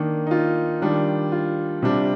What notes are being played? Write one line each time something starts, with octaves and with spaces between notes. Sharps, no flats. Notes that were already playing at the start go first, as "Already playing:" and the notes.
Already playing: D#3 A#3 D4
D#4
F4
D#3 G3 D4
F4
C3 G3 D4